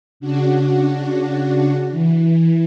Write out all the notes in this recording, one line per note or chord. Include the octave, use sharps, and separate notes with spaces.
C#3 D4 F#4
E3